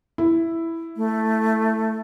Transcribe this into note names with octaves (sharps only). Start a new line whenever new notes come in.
E4
A3